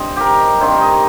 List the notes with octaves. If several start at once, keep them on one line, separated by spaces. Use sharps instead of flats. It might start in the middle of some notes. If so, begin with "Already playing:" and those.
Already playing: G2 C4 C5 D#5
G4 A#4
G2 D#3 C4 C5
D#5